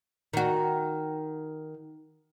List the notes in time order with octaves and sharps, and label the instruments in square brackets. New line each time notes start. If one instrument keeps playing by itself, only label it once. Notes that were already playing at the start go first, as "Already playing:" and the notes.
[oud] D#3 F#4